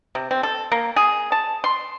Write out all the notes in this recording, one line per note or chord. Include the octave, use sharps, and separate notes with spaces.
C3
C4
A4
A#3
G#4
A5
C6